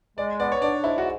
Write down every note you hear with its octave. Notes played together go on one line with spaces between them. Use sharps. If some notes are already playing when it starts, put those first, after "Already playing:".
G#3 D5
B3 D5
C#5
D4 D5
G#2 E4
F#4